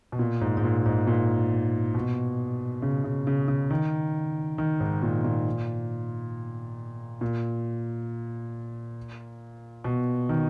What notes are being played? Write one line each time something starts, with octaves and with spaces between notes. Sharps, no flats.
B2
A#2
G#2
G#2
A#2
G#2
A#2
B2
C#3
C#3
C#3
C#3
D#3
D#3
G#2
A#2
A#2
A#2
B2
D#3